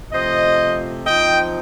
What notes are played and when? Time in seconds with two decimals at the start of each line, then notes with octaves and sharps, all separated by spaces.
0.12 C3 F3 A3 C5 D#5
1.06 F3 C4 D#4 D#5 G5